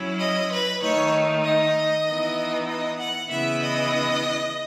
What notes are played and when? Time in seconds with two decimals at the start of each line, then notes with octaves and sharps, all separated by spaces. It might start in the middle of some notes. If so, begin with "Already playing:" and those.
Already playing: F#3 C#4 E4
0.19 D#5
0.51 B4
0.81 D#3 A3 D#4 C#5
1.44 D#5
2.07 E3 B3 D#4
2.68 D#5
2.99 F#5
3.30 C#3 E3 B3 E4 E5
3.63 D#5